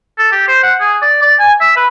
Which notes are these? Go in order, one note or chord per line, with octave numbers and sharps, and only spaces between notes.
A4
G4
C5
F#5
G#4
D5
D5
G#5
E5
B4